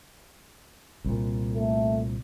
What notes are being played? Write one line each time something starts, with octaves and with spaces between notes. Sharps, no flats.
C2 A#2
A3